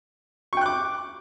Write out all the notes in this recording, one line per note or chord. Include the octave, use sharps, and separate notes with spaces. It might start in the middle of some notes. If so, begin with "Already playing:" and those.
G5 C#6 D6 F#6